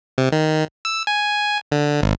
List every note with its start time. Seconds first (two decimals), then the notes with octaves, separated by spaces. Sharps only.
0.18 C3
0.32 D#3
0.85 E6
1.07 G#5
1.72 D3
2.02 G#1